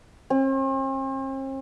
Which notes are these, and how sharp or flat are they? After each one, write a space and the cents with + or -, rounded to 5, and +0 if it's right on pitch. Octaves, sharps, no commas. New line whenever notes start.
C4 +45